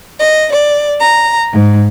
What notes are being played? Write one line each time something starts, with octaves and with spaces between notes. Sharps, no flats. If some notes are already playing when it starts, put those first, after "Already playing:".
D#5
D5
A#5
G#2